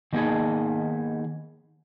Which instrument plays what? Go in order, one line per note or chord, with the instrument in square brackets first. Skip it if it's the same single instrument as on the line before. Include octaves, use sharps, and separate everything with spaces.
[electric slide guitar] D#3 A#3 B3 D#4 G#4